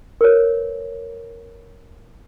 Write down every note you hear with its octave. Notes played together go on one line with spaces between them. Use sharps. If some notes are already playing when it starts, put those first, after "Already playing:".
A#4 B4 C#5